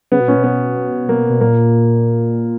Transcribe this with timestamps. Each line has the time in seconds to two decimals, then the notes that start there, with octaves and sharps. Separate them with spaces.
0.12 C#3 B3
0.20 B2
0.28 A#2 C#4
0.37 B2
0.44 B3
1.09 A#3
1.29 B2
1.41 A#2 A#3